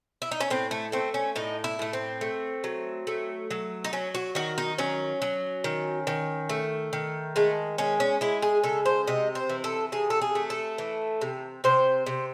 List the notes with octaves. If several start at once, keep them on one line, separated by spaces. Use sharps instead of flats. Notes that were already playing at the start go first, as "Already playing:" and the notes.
E4
D#4
C#4
A2 C4
A3
A3 C4
C#4
A2 D#4
E4
A2 A3
C4
A3
F#3
A3
F#3
D#4
F#3 C#4
F#4
D#3 F#4
D#4
F#3 C#4
F#3
D#3
D#3
A3
D#3
G#3 A3
G#3 C#4
C#4
G#3 E4
G#4
C#3 A4
C5
C3 D#5
C5
E3
A4
C3 G#4
A4
G#4
A3
A4
E3
C3
C3 C5
C3